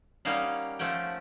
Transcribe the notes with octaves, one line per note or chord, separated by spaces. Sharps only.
G3 A#3 C#4 D#4 F5 F#5
F3 A3 C#4 F#5 G5